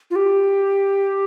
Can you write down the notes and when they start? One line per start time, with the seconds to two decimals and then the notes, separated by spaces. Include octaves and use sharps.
0.11 F4
0.16 G4